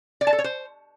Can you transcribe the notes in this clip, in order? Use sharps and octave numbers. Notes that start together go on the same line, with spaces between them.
D5
A5
A4
C#5
C5